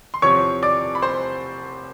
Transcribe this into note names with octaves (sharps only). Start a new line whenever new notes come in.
C6
E2 C3 F3 C#5 C#6
D5 D6
B5
C5 C6